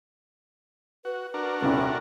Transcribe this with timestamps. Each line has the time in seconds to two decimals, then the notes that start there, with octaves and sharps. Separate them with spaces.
1.05 F#4 B4
1.34 D4 F#4 A#4
1.61 D#1 C2 C#4 E4